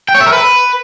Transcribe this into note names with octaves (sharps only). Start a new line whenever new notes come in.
G5
C#5
E5
A#4
B4